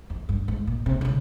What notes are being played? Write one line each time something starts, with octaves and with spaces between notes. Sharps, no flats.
F2
G2
G#2
A#2
C3
D#3
C#3